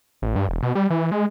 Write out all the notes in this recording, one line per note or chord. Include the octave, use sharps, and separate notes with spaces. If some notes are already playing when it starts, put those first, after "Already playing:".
A1
G2
E1
B2
G3
E3
G#3